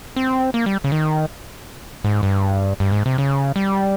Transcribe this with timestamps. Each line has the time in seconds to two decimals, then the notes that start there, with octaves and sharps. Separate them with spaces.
0.16 C4
0.54 A#3
0.66 G3
0.84 C#3
0.92 D#3
2.04 G#2
2.23 G2
2.80 G2
2.92 G#2
3.06 C3
3.18 C#3
3.56 G3